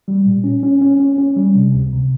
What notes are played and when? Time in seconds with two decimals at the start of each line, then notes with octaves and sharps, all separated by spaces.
0.08 G3
0.26 A#2
0.44 C#4
0.63 C#4
0.81 C#4
1.00 C#4
1.18 C#4
1.36 G3
1.55 C3
1.74 C#2
1.92 C3